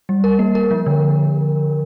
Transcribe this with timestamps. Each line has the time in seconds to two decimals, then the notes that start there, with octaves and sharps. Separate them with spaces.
0.09 G3
0.24 A#4
0.39 A#3
0.55 A#4
0.71 F3
0.86 D3